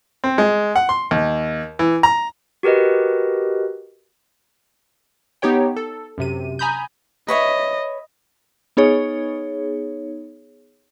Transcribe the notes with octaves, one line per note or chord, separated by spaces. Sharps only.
C4
G#3
F#5
C6
D#2
E3
A#5
F#4 G4 A#4 B4 D#5
B3 D#4 G4 C#5 G5
A4
F#2 C3 D#7
G#5 A#5 B5 D#6 G6
B4 C#5 D#5 E5
B3 D#4 G#4 C#5